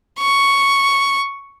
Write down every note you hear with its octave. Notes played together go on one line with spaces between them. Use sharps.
C#6